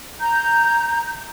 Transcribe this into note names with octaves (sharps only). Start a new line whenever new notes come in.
A#5 G6